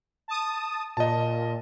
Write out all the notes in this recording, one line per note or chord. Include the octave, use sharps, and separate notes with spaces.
A5 D#6
A#2 D#5 A5